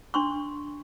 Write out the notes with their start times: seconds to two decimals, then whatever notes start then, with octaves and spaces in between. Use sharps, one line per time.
0.14 D4 C6 C#6